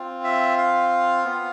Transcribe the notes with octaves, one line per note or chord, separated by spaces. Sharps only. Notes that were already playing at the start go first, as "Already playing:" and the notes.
Already playing: C4 F4
E5
F5
B3 F4